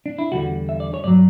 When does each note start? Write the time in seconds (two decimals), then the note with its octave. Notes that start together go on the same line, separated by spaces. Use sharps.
0.06 D4
0.19 E4
0.32 E2 D3 G3 F#4
0.69 E5
0.80 D5
0.94 C#5
1.04 G2 F#3 D5